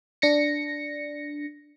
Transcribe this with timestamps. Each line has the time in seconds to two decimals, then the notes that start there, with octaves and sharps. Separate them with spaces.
0.22 D4 A#6 C#7